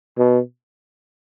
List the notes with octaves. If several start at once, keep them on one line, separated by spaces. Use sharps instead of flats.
B2